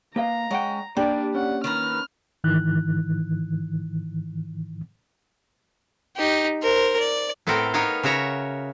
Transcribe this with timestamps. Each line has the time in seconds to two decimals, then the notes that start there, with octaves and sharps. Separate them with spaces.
0.16 A#3 B4 D#5 F5 A#5
0.51 G#3 C#4 F#5 G5
0.97 G3 A#3 D4 G4
1.35 C#4 F#5
1.64 D#3 B4 A#5 F6
2.44 G#2 D#3 E3 F#6
6.17 D#4 G4
6.63 A#4 C5
7.00 D5
7.47 A2 B3 C4 A4 A#4 G5
7.74 B3 D#4 A#4 C#5 F5
8.03 C#3 F#4 C#5 E5 A#5